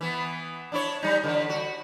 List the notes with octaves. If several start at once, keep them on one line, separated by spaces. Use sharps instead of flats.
E3 B3
D4 E4 C#5
G3 D#4
D3 E3
F#4